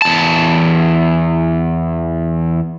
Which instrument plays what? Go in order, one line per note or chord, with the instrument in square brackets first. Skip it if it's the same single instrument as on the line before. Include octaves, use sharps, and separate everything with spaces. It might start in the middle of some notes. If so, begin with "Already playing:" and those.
[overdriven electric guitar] E2 A5